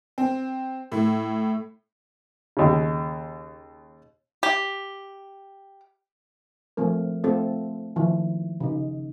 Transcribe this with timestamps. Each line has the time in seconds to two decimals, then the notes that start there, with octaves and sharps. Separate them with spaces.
0.18 C4
0.92 A2
2.57 D#2 C#3
4.43 G4
6.77 F3 A3 C4 A#4
7.24 A3 C4 F4 A4
7.96 D#3 F3 E4
8.60 C#3 D#4